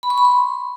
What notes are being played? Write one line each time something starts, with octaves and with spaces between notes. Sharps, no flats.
B5
C#6
B5
C6